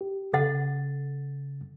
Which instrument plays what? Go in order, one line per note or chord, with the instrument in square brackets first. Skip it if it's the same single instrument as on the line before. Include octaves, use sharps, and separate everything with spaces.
[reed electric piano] G4
[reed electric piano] C#3 A6 [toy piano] A4 F#5